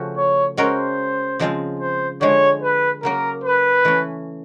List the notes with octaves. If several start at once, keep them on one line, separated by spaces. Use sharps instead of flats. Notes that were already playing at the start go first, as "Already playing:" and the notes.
Already playing: C#3 F3 A3 C#4 F#4
C#5
G#3 C#4 F#4 A#4 C5
C#3 F3 G#3 C4 F4
C5
D3 F3 G#3 C#5
B4
C#3 F#3 A#3 A#4
B4
E3 A3 C#4